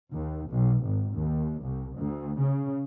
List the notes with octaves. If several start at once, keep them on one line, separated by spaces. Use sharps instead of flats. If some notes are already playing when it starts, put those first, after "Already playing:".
D#2
B1
G#1
D#2
C2
D2
C#3